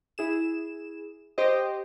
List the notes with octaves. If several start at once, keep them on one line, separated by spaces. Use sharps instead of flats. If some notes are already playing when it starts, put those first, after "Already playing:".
E4 G#4 E7
G4 C5 D#5